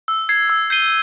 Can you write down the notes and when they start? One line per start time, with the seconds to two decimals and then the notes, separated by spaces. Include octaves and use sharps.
0.08 E6
0.29 G#6 C7
0.49 E6
0.70 G6 C7 D#7 G7